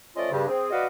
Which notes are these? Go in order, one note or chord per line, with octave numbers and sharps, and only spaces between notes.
F3 A3 C#4 F4 D5 D#5
G2 C#3
C4 G#4
F#4 B4 D5 D#5 F5